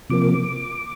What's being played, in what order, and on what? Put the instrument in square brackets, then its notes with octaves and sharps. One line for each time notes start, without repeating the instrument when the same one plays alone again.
[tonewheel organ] C3 F3 A#3 D6